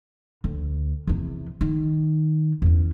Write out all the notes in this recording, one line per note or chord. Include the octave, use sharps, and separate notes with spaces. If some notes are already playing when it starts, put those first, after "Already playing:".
D2
E2 C3
D#3
E2 C#4